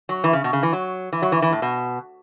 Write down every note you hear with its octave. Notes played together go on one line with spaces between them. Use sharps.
F#3
E3
C#3
B2
C#3
E3
F#3
E3
F#3
E3
E3
A2
B2